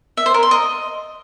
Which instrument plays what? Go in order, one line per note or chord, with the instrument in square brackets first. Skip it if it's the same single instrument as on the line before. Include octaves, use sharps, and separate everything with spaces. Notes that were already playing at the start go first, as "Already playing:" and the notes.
[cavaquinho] E5
C5
A#4
C6
D#5